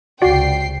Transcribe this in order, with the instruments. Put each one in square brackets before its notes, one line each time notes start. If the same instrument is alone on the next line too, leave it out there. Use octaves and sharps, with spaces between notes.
[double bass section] C#2 C3 [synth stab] F#4 D5 [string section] G5 C7